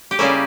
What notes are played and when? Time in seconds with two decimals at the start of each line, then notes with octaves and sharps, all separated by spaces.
0.11 G4
0.19 C#3 G3 A#3 C#4 E4